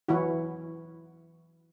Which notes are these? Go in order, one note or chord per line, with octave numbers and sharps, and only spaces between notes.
E3 F#3 E4 F#4